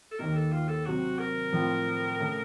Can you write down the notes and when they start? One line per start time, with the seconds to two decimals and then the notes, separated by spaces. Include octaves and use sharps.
0.12 A4
0.19 D#2 D#3 A#3 A#4
0.36 A4
0.52 F4
0.69 A4
0.86 C3 F#3 C4 F#4
1.19 A#4
1.52 A2 F3 C4 F4
2.19 C#3 A3